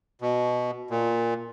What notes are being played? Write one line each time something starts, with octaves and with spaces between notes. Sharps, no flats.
B2
A#2